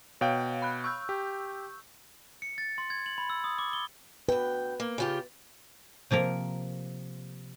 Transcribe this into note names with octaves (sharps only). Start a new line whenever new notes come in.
B2 C#5 F5 G5
B5 F#6
C#6 E6 G6
G4
C#7
A6
C6
G#6
F#7
B5
E6
D#6
D6
G7
D2 B4 G5
A#3
C#3 F4 G4
C3 F3 A#3 A#4